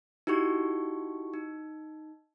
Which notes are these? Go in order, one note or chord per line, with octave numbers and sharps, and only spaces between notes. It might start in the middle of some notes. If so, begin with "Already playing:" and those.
D#4 E4 F#4 G4 C#6
D#4